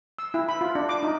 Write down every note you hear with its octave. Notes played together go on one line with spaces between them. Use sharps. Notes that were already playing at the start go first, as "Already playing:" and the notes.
E6
E4
B5
F4
D4
D6
D#4